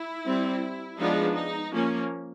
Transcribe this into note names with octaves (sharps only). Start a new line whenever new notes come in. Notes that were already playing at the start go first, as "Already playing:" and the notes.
Already playing: E4
G3 C4
F3 G#3 B3 D4 D#4
D#4
F3 A#3 C#4